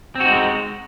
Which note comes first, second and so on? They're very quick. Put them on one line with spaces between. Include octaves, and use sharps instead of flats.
C4 F#4 D#4 G#3